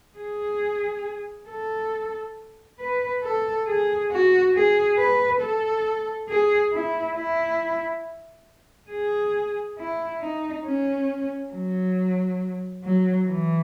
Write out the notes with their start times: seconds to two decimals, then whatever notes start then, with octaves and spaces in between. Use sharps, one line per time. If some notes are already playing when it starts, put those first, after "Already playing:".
0.18 G#4
1.49 A4
2.79 B4
3.24 A4
3.67 G#4
4.11 F#4
4.54 G#4
4.98 B4
5.41 A4
6.29 G#4
6.73 E4
7.16 E4
8.91 G#4
9.79 E4
10.22 D#4
10.66 C#4
11.53 F#3
12.84 F#3
13.28 E3